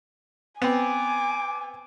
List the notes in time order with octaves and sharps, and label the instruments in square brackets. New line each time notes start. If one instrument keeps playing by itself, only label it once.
[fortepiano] B3 C4 [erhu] G#5 [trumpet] D6